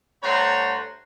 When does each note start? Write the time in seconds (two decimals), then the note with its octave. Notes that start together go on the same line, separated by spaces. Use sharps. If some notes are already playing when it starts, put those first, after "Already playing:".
0.23 G2 A3 C5 C#5 F#5 A#5